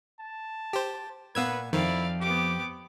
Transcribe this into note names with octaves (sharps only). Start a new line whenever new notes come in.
A5
G4 C5
A#2 B3 B4 F5 F#5 E6 G#6
F2 D#3 F3 E4 D5 F5
B3 G4 D6